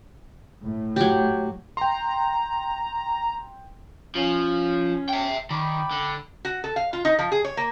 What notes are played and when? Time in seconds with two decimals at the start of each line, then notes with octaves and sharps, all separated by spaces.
0.65 A2
0.96 F#3 G4
1.77 G5 A#5 C6
4.15 F3 C#4
5.09 E5 G5
5.50 D#3 D5 G5 B5
5.91 D3
6.45 F#4
6.64 A4
6.76 F5
6.93 F4
7.05 D#4
7.19 F3
7.32 G#4
7.45 C#5
7.57 A#3